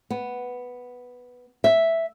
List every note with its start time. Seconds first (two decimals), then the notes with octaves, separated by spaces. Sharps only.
0.10 B3
1.64 E5